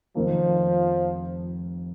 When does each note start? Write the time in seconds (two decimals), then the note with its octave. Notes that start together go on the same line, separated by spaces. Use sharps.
0.15 F1 F2 D#3 F3 A#3